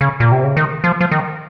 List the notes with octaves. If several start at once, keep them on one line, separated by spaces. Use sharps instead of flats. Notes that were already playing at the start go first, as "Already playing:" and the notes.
C#3
A#2
C3
C#3
D#3
F3
F3
D#3